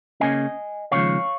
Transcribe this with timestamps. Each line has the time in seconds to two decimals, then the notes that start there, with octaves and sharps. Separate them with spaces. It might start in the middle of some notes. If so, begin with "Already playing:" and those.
0.20 C#3 A#3 C#4 D#5 G#5
0.92 D#2 C#3 F3 G#3 C#5 F5